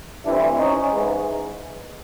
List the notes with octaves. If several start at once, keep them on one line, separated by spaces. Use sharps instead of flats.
G2 E3 A3 C4 D4 E4
C#4 D#4
G#2 E3 G#3